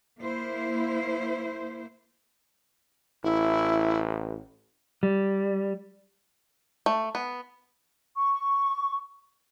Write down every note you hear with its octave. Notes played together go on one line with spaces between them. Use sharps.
A#3 E4 C5
A1 E4
G3
A3
B3
C#6